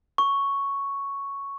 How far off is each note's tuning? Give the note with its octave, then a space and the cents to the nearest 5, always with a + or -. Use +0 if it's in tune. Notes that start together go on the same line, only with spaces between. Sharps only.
C#6 +0